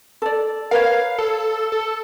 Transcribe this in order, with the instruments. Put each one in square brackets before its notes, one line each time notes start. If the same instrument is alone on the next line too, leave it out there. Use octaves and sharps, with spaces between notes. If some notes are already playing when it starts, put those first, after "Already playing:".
[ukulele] A4 D5
[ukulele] A#4 B4 C#5 [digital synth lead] F5
[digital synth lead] A4
A4